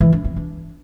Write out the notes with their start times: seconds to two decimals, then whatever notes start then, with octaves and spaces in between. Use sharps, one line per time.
0.01 E3
0.12 D4
0.24 C4
0.36 D4